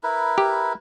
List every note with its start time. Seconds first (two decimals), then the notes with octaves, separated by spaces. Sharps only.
0.03 E4 A#4 B4
0.38 G4